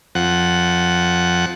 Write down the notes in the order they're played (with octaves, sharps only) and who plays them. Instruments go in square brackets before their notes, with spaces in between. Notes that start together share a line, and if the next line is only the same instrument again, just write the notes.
[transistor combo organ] F2 F#5